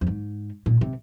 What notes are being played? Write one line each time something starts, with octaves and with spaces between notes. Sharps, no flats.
F2
G#2
A#2
C3